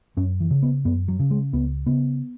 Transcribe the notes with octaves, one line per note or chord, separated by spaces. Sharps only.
F#2 C#4
E3
C#3
B3
F#2 B3
F#3
C#3
G#3
C#2 B3
C#3 B3